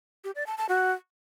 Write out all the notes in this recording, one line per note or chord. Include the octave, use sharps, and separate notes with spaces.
G4
D5
A5
A5
F#4